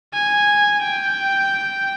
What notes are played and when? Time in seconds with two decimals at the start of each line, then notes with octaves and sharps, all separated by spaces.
0.13 G#5
0.82 G5